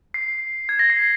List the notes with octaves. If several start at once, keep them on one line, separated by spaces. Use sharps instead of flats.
C7
G#6
A#6
C7